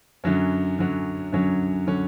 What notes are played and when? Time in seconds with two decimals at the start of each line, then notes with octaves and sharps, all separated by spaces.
0.24 F#2 D3 F#3 C#4
0.79 F#2 D3 F#3 C#4
1.32 F#2 D3 F#3 C#4
1.87 D3 F#3 C#4